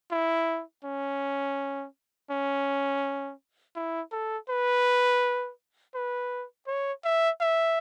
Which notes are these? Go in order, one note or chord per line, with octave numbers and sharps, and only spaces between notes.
E4
C#4
C#4
E4
A4
B4
B4
C#5
E5
E5